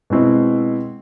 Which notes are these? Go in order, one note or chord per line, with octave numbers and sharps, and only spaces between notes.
B2 G#3 C4 E4